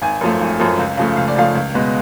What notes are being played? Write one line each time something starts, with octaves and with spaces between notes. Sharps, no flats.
G#1 G#5
F#2 F3 A3
G#1
F#2 F3 A3
C#2
C#3 F3 A3
C#2 F5
D5
C#3 F3 A3 F5
C#2
B2 G#3 B3